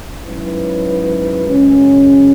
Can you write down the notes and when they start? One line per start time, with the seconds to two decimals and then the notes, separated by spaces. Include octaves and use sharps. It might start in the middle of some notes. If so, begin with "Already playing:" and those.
0.25 G#2 F#3 C#4 E4 B4
1.44 F#2 C#3 G#3 C#4